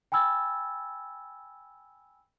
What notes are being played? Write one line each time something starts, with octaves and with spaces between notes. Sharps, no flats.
G5 G#5 B5 E6 G#6 A6